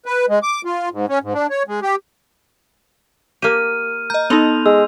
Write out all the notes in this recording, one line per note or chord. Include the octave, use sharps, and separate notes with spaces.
B4
G#3
D6
F4
G#2
C#4
G#2
D4
C#5
G#3
G4
A#3 G4 F6 D#7
D#5 A#5 G6
B3 D#4 A4 D#5 C6 F7
G#3 E6